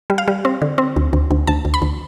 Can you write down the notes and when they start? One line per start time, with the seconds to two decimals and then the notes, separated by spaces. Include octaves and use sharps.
0.10 G3
0.18 F5
0.28 G3
0.45 C4
0.62 D3
0.78 C4
0.96 D2
1.13 D2
1.31 D2
1.47 D2 A5
1.65 D2
1.74 B5
1.82 D2